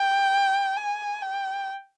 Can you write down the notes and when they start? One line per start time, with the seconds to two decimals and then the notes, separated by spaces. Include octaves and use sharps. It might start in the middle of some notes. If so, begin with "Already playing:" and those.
Already playing: G5
0.77 G#5
1.22 G5